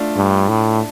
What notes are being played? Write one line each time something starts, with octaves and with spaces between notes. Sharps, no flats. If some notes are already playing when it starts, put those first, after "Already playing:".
Already playing: A3 D4 F4
G2
A2